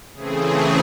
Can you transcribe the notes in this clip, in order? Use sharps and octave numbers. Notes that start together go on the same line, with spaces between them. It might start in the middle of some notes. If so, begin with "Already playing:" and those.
C#3 E3 A3 C4 G#4